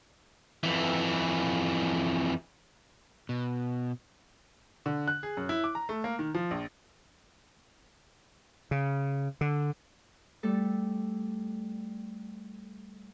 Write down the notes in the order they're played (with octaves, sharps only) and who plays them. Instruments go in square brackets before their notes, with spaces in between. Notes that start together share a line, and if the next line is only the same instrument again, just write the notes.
[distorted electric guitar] F2 E3
[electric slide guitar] B2
[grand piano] D3
F#6
G#4
F#2
E4
D6
A#5
A3
A#3
D#3
F3
A#1
[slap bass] C#3
D3
[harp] G3 A3 A4